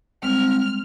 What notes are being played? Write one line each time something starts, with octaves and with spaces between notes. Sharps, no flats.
G3 G#3 C4 F6